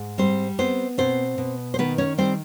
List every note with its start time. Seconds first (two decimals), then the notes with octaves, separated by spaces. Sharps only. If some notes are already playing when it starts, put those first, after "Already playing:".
Already playing: G#2
0.18 G3 C4 C5
0.59 B3 C4 C5
0.98 B2 C4 C5
1.38 B2
1.74 C5
1.79 D#3 B3 B4
1.98 C#4 C#5
2.18 G3 C4 C5